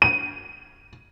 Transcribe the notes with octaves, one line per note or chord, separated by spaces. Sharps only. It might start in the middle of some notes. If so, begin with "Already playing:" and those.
D#7